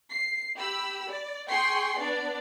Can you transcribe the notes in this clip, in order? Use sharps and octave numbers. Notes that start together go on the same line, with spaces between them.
C7
G4 B5 E6
D5
G#4 G5 C6 C#6 C7
B3 D4 D5